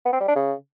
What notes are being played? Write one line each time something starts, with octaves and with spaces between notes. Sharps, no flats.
B3
C4
G3
D4
C#3